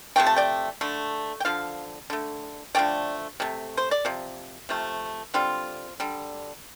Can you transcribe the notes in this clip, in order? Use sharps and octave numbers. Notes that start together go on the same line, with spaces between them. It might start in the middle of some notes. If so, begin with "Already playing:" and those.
C3 F3 A3 G5
A5
D5 G5
D3 A3
G5
D3 F3 F5
D3 A3
D3 F3 A3 D5 G5
C3 A3
C5
D5
C3 F3
C3 F3 A3
D3 G3 C4 F4
D3 G3